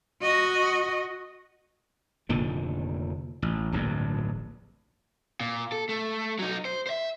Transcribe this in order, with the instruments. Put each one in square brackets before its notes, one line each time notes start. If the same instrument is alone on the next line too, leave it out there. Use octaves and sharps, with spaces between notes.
[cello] F#4 D#5
[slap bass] F1 A#2 D3 D#3
A1
D1 A#1 G2
[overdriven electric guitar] A#2
A4
A3
F#3 D#4
C5
C5 E5